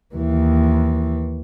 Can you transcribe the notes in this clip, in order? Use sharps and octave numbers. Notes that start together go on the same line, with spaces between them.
D#2 E3